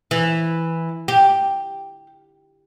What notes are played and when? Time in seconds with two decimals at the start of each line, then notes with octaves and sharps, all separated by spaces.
0.11 E3
1.08 G4